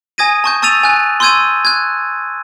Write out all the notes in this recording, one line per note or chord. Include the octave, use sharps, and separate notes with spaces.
G#5 D#6 G#6 A#6 D#7
A5 C#6 G6
A5 C#6 E6 A6 D#7 F7
G#5 F#6
C6 C#6 E6 G6 G#6 D#7
F#6 G#6